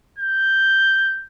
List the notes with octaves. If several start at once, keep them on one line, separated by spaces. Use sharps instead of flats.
G6